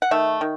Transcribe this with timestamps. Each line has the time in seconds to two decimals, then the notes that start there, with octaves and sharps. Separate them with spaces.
0.02 F#5
0.11 D#3 A3 E5
0.41 D#3